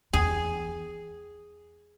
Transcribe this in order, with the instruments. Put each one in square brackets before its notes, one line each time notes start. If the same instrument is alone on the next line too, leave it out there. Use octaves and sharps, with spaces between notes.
[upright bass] E2 [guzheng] G#4